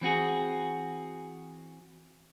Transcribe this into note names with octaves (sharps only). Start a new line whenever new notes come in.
E3 C4 F#4 G#4